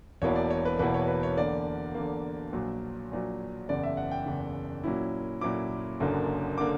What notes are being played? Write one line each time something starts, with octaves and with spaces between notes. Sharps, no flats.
E1 E2 B2 A#3 E4 C#5
D5
C#5
B4
E1 E2 B2 A#3 E4 B4
C#5
B4
C#5
E2 D3 A#3 D5
E2 D3 A#3
A#1 A#2 F#3
A#1 A#2 F#3
F#1 E2 C#3 D5
E5
F#5
G5
F#1 E2 C#3
A#2 F#3 C#4 E4
A#2 F#3 C#4 E4 D6
F#1 F#2 D3 A#3
D3 A#3 D6